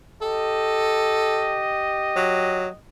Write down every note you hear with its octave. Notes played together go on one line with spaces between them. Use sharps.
G4 A4 D#5
F#3